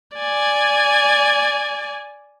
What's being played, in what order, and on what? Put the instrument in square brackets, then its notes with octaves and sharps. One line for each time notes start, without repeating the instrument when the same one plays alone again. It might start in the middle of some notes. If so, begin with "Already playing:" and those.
[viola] D5 G#5